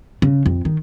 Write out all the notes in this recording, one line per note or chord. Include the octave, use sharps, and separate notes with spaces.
C#3
F2
D#3